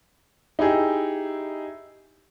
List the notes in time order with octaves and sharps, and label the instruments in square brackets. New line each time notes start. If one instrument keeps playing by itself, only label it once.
[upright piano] D#4 E4 G4 G#4